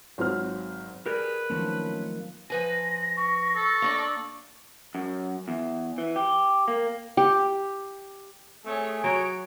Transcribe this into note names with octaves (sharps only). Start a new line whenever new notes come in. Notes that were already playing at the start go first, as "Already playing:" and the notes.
G#1 F#3 C4 F6
G4 G#4 A#4 B4 D5
A2 D#3 F3 F#3 A#3 C4 C#4 A5
F3 B4 G#5 A#6
C#6
A4
A#3 D4 D5
F#2
E2
E3
G4
A#3
G4
A3 C4 G#4 C#5
F#3 F#4 C#5 D7